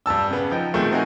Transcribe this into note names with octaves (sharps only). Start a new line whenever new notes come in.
G2 G3 A5 E6
C#3 B3
F3 D#4 G5
B2 D#3 F3 G#3 A3 C4
C4 D#4 F#4 A#4 G#5